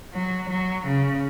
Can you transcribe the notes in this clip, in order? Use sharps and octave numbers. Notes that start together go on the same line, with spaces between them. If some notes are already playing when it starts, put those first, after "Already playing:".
F#3
F#3
C#3